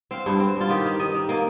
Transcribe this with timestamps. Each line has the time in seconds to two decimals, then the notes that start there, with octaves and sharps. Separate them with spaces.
0.11 C4 F5
0.26 G2
0.40 C4
0.56 G2 F4
0.69 D#3 G4
0.85 D#3
0.99 D#3 D#5
1.14 D#3
1.29 A#3 D#5